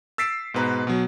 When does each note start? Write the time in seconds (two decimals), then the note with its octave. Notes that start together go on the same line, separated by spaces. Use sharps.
0.18 E6 A6 B6 C7 D7 E7
0.54 G#2 B2 B4 A#5
0.87 B2 F#3